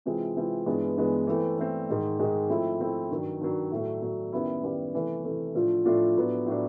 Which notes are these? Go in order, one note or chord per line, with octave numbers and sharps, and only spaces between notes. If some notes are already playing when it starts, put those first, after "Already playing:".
C3 E3 G#3 C4 F4
C3 E3 G#3 C4 F4
G2 E3 G#3 B3
G2 E3 G#3 B3
E3 A3 C4
E3 A3 C4
G#2 D#3 G#3
G#2 D#3 G#3
F3 A3 C4 E4
F3 A3 C4 E4
G2 D#3 F#3
G2 D#3 F#3
A2 F#3 A3
A2 F#3 A3
F#2 D#3 G3 B3 E4
F#2 D#3 G3 B3 E4
C3 E3 A3
C3 E3 A3
A2 F3 A3 D4 F4
A2 F3 A3 D4 F4
A2 F#3 B3 D4
A2 F#3 B3 D4